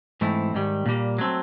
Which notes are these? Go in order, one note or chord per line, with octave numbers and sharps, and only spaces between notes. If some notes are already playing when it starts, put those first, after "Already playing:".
G#2 E3 A3 C4 E4
G#2 D#3 G3
A#2 G3 A#3
F#3 A3 C4